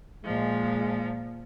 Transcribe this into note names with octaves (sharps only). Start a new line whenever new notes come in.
A#2 F3 G#3